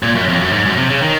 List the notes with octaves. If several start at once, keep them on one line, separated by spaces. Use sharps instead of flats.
A#2
F#2
F2
F#2
G#2
F#2
C3
C#3
D#3